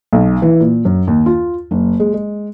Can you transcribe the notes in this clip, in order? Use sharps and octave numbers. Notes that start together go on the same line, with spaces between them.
B1
E3
A#2
F#2
D#2
F4
F#1
G#3
G#3